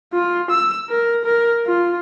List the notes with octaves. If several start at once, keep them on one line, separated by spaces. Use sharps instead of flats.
F4
E6
A#4
A#4
F4